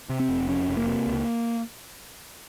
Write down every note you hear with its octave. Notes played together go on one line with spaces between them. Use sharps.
C3
C4
F1
F2 C#4
F1
A#3
C3
C#2